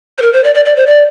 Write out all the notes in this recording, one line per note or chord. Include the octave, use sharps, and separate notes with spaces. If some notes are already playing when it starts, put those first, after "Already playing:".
C5
A#4
C5
D5
D5
D5
C5
D5